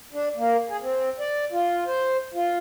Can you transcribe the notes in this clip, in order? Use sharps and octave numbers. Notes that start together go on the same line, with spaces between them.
D4
A#3
G#4
C4
D5
F4
C5
F4